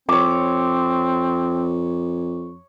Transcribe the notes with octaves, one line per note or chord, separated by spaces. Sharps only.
F2 C4 C#5 D6